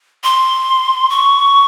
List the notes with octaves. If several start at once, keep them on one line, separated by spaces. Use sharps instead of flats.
C6
C#6